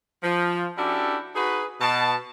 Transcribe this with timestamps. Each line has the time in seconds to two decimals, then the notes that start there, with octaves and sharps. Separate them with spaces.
0.23 F3
0.78 C#4 D4 E4 F#4 G4 A4
1.35 D#4 F#4 G#4 B4
1.81 B2 A5